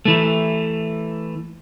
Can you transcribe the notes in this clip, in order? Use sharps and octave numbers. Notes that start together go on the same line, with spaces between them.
E3 A3